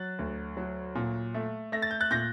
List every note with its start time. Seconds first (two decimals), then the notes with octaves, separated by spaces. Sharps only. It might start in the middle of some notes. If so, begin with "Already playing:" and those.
Already playing: F#3 F#6 A6
0.19 D2
0.57 F#3
0.95 A#2
1.34 A3
1.72 A3 A#6
1.82 A6
1.91 G6
2.00 F#6 A6
2.11 A#2 G6 A#6